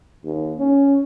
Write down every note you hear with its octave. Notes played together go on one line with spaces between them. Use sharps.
D#2
C#4